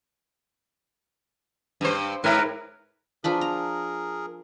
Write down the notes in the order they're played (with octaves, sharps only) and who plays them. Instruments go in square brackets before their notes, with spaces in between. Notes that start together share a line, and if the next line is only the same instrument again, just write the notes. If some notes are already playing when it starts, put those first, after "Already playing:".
[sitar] G2 C5
[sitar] G#2 [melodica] E4 A#4 B4
[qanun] F3 D4 B4 [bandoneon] G#4 A#4
[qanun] A#5